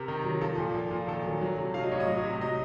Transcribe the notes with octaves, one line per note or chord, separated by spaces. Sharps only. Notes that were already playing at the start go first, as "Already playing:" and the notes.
Already playing: C3 A#4
D#3
F#3
F3 A4
A#2
F3
A#2
D#3 A4
F#3
F#3
C3
F#3 F5
D#5
A2 C#5
D#5
F#3
C3
F#3 D#5